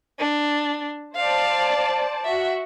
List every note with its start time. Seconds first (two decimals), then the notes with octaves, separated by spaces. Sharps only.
0.19 D4
1.15 C5 D5 F5 A5
2.25 F#4 E5